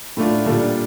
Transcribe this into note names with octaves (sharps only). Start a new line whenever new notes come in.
A2 A3 D4 F4
A#2 G3 D4 F4 A4